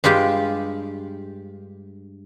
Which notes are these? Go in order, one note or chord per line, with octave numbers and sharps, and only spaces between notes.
G2 G#3 F4 G4